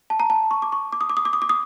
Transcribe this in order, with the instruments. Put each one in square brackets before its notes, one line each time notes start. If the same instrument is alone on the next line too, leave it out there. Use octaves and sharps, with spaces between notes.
[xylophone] A5
A#5
A5
C#6
D6
C#6
D6
D#6
D6
D#6
D6
D#6
D6
D#6